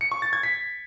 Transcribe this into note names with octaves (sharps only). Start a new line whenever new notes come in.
C#7
C#6
A6
G#6
B6